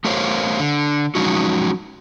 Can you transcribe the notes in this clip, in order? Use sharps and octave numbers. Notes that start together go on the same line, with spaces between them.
A3 G4 A#4 C5 C#5 F5
D3
F3 F#3 G#3 C#4 D#4 F#4